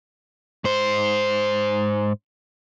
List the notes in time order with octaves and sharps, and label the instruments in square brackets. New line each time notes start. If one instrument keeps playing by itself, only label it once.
[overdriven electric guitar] G#2 C5